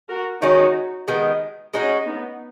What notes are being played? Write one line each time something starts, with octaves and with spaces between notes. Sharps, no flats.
F#4 A#4
D#3 G#3 C#4 D#4 F#4
D#3 G#3 B3
G#3 C#4 D#4 F#4
B3 D#4